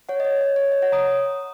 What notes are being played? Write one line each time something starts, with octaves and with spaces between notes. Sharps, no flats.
C#5 F#5
D#5
C#5
D#5
C#5
D#5
C#5 F#5
A#5 D#6